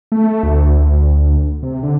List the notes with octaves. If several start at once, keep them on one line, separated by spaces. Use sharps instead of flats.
A3
D2
D2
C3
D3